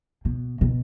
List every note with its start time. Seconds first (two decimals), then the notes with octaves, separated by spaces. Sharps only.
0.25 B2
0.61 B2